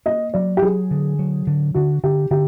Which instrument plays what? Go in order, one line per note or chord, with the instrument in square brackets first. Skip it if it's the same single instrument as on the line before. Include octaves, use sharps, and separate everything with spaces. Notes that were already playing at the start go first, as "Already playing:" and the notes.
[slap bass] A#3 [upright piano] D#5
[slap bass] F#3 [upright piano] D5
[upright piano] G4
[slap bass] F#3 [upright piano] G#4
[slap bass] D3
F#3
D3
[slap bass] D3 [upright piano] F#4
[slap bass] D3 [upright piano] G4
[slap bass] D3 [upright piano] G4